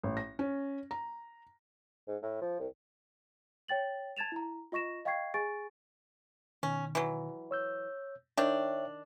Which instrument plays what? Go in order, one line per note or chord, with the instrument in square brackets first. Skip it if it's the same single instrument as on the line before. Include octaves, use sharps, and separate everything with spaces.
[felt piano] A1
A#6
C#4
A#5
[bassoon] G#2
A2
F3
C2
[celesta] C#5 G5 A6 F#7
A5 G#6 A6 E7 F7
E4 A#5
F4 D#5 C#6 A#6 E7
D#5 F5 G5 C#6 G#6 C7
G#4 G#5 C#6 A6 D7
[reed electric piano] B2 D#3 [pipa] C#4
[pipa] E3 F#3
[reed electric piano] C#5 E6 G6
[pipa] D#3 D4 [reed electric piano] C#5 E5 G5